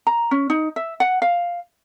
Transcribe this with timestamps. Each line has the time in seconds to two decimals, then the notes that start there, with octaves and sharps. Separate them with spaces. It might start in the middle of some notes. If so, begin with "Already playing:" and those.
0.07 A#5
0.31 C#4
0.50 D#4
0.76 E5
1.00 F#5
1.22 F5